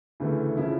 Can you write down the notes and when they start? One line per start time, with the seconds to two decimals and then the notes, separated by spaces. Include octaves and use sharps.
0.20 D2 C#3 E3 A3
0.57 C#3 F3 C#4 E4